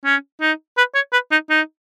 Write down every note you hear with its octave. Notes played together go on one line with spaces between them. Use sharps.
C#4
D#4
B4
C#5
B4
D#4
D#4